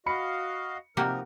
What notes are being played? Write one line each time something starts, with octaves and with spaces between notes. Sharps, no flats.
F#4 D#5 F5 B5 C#7
C3 F3 A#3 D#4 F#4 G4 A#4